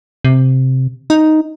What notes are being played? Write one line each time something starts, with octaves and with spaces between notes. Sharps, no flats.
C3
D#4